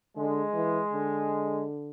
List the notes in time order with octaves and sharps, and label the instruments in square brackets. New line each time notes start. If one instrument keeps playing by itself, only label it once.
[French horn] D3 [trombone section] G#3
[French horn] E3
D3